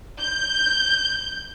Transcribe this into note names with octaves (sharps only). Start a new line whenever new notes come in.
G6